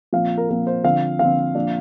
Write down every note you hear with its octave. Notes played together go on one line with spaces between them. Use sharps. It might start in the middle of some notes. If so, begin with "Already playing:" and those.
A#2 F3 C4 F5
A#4
A#2 F3 C4 A#4
C5
D3 F3 C4 F5
D3 F3 C4 F5
A#2 F3 D4